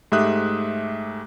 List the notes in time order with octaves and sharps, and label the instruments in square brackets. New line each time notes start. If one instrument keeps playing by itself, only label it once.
[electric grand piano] G#2 A3 G4 E5 D#6 F#6